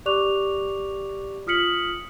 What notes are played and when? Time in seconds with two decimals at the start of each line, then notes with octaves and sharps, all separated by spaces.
0.06 G4 D5 C#6 D6 F#6 F7
1.47 F4 D#6 F6 B6 C#7 F#7